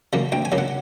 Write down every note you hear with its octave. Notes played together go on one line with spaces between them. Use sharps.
C#3 F#3 A#3
D2 G5
G#5
C#3 F#3 A#3
F#5